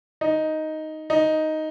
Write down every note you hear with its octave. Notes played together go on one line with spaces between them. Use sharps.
D#4
D#4